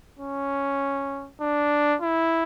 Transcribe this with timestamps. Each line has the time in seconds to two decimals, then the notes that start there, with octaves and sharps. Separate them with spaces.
0.19 C#4
1.41 D4
2.02 E4